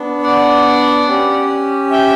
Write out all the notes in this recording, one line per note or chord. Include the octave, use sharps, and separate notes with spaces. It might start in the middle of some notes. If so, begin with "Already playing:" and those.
Already playing: B3 D4
D5 F#5
C#4 G4
E5 G5